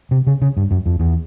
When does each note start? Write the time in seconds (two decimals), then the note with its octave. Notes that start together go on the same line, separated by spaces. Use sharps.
0.11 C3
0.27 C#3
0.41 C#3
0.57 G2
0.71 F#2
0.86 F2
0.99 E2